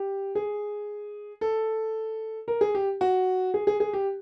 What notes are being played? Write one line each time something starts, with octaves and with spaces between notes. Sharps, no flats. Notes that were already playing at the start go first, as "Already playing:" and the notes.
Already playing: G4
G#4
A4
A#4
G#4
G4
F#4
G#4
G#4
G#4
G4